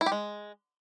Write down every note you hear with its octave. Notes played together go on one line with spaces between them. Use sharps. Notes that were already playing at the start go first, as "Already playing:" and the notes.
E4
G4
G#3